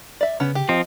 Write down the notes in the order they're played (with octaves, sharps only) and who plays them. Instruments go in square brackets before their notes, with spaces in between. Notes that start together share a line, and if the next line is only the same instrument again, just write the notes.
[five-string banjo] D5 E5
[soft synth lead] C#3 [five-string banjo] B3 C#4
[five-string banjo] G4
[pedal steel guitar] F3 C4 [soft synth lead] D#5